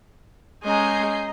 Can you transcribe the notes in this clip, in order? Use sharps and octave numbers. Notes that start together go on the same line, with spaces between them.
G#3 C#4 D#5 G#5 A#5 G6 C7